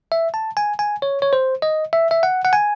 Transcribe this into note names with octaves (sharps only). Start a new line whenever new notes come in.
E5
A5
G#5
G#5
C#5
C#5
C5
D#5
E5
E5
F#5
F#5
G#5